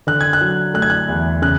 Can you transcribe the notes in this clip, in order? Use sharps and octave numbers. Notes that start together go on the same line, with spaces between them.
D3 F#6
G#6
F#6
F#3
A3 F#6
G#6
F#6
E2
C#3 F#6